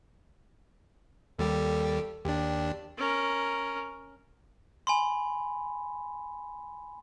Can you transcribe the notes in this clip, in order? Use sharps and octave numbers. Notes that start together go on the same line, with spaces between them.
D#2 G3 G4 A4
D#2 D4 G4
C#4 A#4
G#5 B5 C6